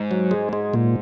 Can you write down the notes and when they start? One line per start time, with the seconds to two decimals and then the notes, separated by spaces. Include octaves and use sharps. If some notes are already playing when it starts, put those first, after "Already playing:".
Already playing: G#2
0.11 F#3
0.31 G#3
0.53 G#3
0.74 A#2